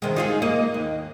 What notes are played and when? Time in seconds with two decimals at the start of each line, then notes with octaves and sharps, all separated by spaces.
0.02 C3 D#3 G#3
0.16 D#4 F4 G#4
0.42 A#3 D#5
0.74 D#2